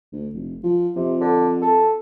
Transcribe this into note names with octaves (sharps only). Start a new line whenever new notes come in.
D2
F1
F3
F2 C3
D3
A4